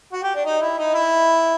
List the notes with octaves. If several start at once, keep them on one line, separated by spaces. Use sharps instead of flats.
F#4
G4
D4
D#4
E4
D#4
E4